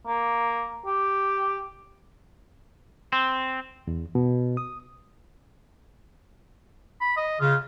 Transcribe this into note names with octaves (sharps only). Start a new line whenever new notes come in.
A#3
G4
C4
E2
B2
D#6
B5
D#5
C#3 F4